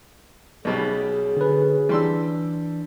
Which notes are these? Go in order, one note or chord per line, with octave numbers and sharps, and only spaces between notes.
B1 B2 G3 C#4 F#4 G#4
D3 B4
E3 G3 D4 C6 E6